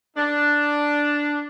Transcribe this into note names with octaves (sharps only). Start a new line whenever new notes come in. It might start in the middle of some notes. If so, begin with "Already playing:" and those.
D4